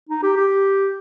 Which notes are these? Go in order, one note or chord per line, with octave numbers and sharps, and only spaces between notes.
D#4
G4
G4